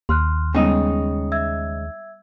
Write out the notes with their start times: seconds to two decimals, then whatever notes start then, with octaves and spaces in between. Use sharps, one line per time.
0.09 D#2 C6 F6 F#6
0.55 C#3 G3 G#3 B3 D#4 G5 D#6
1.32 E5 E6 G#6